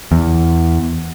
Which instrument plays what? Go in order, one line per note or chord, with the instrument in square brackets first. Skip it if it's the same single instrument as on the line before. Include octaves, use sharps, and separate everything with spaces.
[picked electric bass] E2